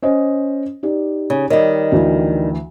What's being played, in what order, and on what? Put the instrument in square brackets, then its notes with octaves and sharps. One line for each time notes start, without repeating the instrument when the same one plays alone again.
[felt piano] C#4 C5 D#5
D#4 G4 D5
[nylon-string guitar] C#3
[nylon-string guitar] D#3 G3 [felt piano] C#5 D#5
[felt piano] D2 E3